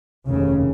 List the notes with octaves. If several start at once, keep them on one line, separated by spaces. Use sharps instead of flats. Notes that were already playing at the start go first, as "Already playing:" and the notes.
F1 D#2 C#3